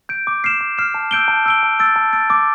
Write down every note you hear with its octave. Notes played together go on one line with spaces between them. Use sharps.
G6 D7
D6
F6 C7 E7
D6
F6 C7 E7
A5
E6 G6 D7 G7
A5
E6 G6 D7 G7
A5
E6 A6 D7
A5
E6 A6 D7
D6